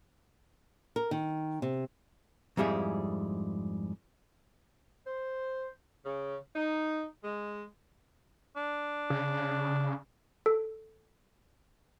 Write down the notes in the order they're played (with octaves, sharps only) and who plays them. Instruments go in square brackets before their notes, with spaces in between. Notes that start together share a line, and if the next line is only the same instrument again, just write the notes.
[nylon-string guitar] A#4
D#3
C3
[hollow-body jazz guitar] F2 G#2 G3 E4 G#4
[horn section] C5
C#3
D#4
G#3
[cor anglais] D4
[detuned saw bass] C#3
[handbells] A4